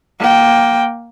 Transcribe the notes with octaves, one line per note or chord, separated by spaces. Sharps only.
A#3 G5